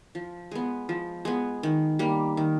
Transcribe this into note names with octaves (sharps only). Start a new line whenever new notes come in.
F3
G#3 B3
F3
G#3 B3
D#3
G3 A#3
D#3